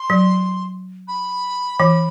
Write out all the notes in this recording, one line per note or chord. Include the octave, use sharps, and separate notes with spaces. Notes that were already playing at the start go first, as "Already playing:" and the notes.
Already playing: C6
F#3
B5
E3